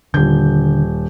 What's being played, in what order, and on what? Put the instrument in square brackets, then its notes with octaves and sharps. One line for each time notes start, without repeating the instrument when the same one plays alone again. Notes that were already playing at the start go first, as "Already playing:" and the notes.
[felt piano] D#1 G6 [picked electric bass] D3